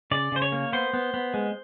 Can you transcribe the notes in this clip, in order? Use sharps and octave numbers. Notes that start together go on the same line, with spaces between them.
C#3 D5
C#3 C5
C#5
A#3
B3 C5
B3
B3
G#3